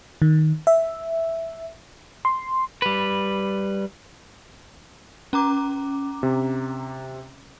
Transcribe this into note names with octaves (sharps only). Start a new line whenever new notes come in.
D#3
E5
C6
G3 B4
C#4 A#5 D6
C3